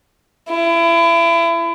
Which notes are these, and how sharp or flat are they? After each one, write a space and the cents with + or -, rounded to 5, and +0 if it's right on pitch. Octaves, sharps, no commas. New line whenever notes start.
E4 +30